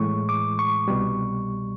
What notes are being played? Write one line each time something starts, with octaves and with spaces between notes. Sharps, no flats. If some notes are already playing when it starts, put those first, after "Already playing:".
Already playing: A2 E3 G#3 C#6
D6
C#6
C2 B2 G3